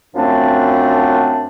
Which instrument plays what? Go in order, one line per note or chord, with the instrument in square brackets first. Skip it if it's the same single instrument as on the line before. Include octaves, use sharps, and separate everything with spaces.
[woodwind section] F#2 F3 A3 C4 D4